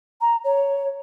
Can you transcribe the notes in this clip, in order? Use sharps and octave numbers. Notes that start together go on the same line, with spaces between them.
A#5
C#5